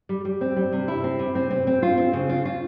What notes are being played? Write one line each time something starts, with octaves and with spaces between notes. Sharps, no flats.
G3
G3
C4
G3
C3
E4
C4
C3
C4
C4
C4
F4
C4
C#3
F4
F4